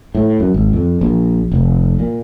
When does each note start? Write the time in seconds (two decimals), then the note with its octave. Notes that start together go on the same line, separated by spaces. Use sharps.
0.15 A2
0.40 F#2
0.54 G#1
0.73 F2
1.01 A#1
1.52 F1
1.99 A#2